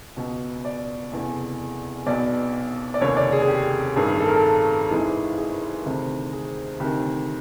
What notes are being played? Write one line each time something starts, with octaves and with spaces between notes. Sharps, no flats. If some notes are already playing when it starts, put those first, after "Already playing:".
C#2 B2
D5
F1 E2 C#3
B1 B2 D5
D5
F1 D#2 C#3 C#5
D5
G#4
G#4
G4
A1 G2 D#3 G#4
A4
A#4
A4
G#1 G#2 E3 G#4
G#4
D2 C3 D#3
G#4
D2 C3 D#3 G4